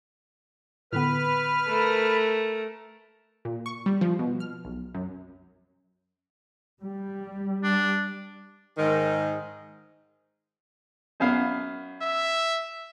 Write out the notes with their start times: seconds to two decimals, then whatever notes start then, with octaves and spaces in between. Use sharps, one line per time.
0.93 A2 D3 B3 B4 F6
1.67 A3 A#4
3.45 A#2
3.66 C#6
3.86 G3
4.01 F3
4.19 B2
4.40 F6
4.65 B1
4.95 F#2
6.82 G3
7.64 D4
8.78 G#2 D#3
11.20 F#2 B3 F5
12.02 E5